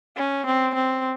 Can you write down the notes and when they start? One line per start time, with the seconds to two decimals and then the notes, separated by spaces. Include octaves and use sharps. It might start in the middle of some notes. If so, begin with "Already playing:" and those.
0.16 C#4
0.46 C4
0.75 C4